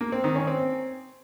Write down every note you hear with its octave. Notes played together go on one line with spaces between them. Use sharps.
A#3
C4
D#3
C#4
C4